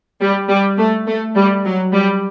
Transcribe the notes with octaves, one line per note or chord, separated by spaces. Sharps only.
G3
G3
A3
A3
G3
F#3
G3